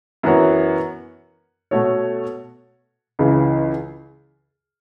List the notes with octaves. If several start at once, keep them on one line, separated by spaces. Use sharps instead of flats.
F#2 E3 B3 F#4 C#5
B2 A3 F#4 A4 C#5
C#2 C#3 E3